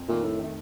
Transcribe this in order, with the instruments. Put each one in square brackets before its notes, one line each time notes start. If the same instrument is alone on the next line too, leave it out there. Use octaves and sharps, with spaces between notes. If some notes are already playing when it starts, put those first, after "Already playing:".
Already playing: [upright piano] F2
[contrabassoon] A#2 [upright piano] D#3 A3
[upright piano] F2 [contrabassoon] A2
[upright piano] D#3
A3